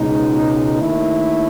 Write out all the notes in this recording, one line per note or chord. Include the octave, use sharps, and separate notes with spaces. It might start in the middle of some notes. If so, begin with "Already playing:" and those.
Already playing: C#2 B2 G#3 D#4
D#2 D#3 A3 E4